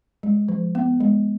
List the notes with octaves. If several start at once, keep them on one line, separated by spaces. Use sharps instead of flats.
G#3
F3
B3
G#3